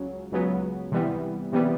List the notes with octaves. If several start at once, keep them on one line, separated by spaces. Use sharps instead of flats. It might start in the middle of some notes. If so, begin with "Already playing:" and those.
Already playing: C#2 C#3 F#3
C#2 C#3 F#3 B3
C3 E3 G3 B3
C3 E3 G3 B3